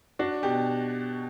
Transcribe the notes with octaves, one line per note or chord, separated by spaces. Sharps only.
D4 F#4
B2 G4